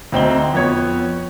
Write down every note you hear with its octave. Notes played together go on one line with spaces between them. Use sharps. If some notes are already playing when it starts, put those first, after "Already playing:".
D2 C4 D#4 G7
F2 B3 C#5